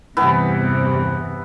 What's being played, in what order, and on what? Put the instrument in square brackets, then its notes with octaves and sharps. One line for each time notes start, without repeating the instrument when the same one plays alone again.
[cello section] E2 G2 C3 [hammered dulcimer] E3 B3 E4